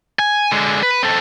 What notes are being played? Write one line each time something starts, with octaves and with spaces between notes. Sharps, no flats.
G#5
D3 G#3
B4
C4 A4